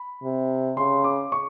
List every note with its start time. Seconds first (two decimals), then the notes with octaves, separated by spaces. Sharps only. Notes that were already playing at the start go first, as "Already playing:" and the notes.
Already playing: B5
0.24 C3
0.77 C#3 C6
1.04 D6
1.32 C#6